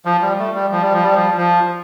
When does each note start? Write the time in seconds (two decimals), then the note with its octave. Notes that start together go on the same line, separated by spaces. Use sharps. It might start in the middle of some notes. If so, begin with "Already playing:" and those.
0.05 F3
0.22 G3
0.39 A3
0.55 G3
0.71 F3
0.82 G3
0.93 F3
1.04 G3
1.14 F3
1.37 F3